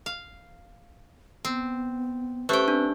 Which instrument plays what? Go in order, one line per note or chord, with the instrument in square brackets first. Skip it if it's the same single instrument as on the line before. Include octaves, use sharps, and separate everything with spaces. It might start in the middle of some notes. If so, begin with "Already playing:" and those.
[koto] F5
[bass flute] B3 [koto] C4
[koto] A3 G5 [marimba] C#4 G4 C5 [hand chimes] B4 F#6
[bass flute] C4 [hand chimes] D4